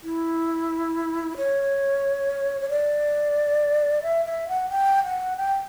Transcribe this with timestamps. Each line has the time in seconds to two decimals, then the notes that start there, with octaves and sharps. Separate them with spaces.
0.04 E4
1.37 C#5
2.61 C#5
2.70 D5
4.03 E5
4.26 E5
4.48 F#5
4.70 G5
5.04 F#5
5.37 G5